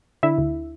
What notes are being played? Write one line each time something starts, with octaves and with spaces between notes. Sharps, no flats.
D3 E4 E5
D2